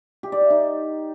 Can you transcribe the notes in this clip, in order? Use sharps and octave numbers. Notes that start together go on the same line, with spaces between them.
G4
D5
E5
D#4